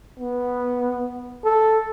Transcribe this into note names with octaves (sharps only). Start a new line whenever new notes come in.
B3
A4